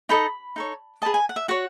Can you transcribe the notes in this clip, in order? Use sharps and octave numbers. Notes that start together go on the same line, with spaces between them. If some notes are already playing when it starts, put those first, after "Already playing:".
D#4 A4 D#5 B5
D#4 A4 C#5
G#4 B4 D#5 A5
G#5
F#5
E5
F#4 C#5 F#5